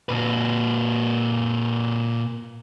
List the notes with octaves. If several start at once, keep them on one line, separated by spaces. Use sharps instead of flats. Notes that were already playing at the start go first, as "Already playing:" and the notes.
A#2 B4